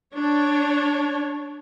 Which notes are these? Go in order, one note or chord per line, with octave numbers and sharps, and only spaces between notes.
D4 C#5